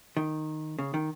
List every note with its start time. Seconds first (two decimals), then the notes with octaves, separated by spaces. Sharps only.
0.17 D#3
0.79 C#3
0.94 D#3